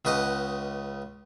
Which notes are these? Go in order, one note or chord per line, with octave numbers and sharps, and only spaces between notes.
C#2 C#3 B4 D#5 F#5